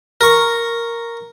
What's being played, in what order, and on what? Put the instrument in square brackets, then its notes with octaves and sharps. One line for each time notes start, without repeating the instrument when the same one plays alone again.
[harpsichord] A#4 C#6